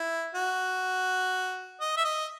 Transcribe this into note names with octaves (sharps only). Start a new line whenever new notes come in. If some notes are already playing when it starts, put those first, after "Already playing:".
Already playing: E4
F#4
D#5
E5
D#5